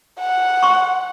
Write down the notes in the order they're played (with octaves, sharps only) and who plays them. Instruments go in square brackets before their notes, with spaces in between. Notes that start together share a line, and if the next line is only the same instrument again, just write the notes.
[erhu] F#5
[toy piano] C6 C#6